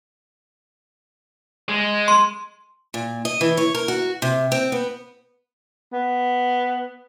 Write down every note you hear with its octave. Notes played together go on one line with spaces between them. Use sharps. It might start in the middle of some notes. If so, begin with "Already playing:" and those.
G#3
C6
A#2
D#5
E3
C#5
A#4
F#4
C3
C4
B3
B3